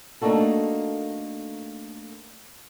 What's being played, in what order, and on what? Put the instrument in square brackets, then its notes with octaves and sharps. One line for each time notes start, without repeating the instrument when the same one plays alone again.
[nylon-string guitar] A3 A#3 D4 D#4 F#4 A4